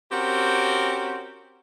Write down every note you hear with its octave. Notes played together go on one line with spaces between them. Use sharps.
C4 C#4 F#4 G4 A#4